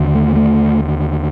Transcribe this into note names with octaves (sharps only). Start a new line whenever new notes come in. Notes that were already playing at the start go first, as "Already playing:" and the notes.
Already playing: D#2 D3
A3
A3